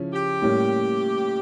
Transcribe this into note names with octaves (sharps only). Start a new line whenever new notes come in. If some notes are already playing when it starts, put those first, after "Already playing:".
Already playing: C#3 F3 C#4 E4
G4
A2 G3 A#3 C#4